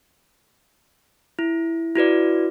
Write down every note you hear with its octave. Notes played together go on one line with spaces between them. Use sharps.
E4
E4 F#4 B4 D5